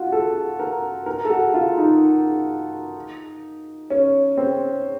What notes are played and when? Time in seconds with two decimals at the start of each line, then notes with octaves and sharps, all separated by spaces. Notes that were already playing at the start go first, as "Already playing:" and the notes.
Already playing: F4 F#4
0.12 A4
0.60 A#4
1.06 A#4
1.25 A4
1.30 F#4
1.54 F4
1.78 D#4
3.90 C#4
4.38 C4